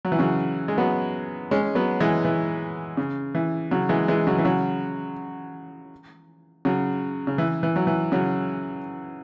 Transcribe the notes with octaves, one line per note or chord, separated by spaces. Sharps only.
F#3
E3
C#3 F#3
G#3
F#3 B3
G#3 C#4
F#3 B3
E3 G#3
E3
C#3
E3
C#3 F#3
E3 G#3
E3 G#3
C#3 F#3
E3
C#3 F#3
C#3 F#3
C#3
E3
E3
F#3
E3
C#3 F#3